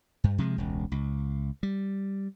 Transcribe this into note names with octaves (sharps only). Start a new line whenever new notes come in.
G2
C3 F3 G#3
E1 C#2
C#2
G3